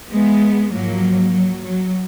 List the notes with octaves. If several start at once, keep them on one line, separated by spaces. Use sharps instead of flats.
G#3 B3
G#2 F3 F#3 A#3
F#3
F#3